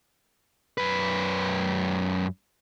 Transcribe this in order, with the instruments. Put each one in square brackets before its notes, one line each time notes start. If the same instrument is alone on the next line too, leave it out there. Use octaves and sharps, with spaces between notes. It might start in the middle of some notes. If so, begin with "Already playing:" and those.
[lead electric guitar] F#2 B4